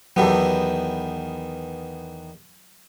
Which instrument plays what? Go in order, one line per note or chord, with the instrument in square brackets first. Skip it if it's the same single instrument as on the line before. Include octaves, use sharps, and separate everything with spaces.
[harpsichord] E2 D#3 B3 [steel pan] F#3 G4 A4